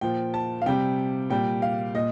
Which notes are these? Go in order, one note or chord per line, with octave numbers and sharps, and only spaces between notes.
A#2 F3 G5
A5
F5
C3 G3 G5
A#2 G3 G5
F5
A#2 D#5